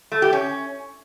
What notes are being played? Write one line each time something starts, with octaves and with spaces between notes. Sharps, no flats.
A3
G4
C#4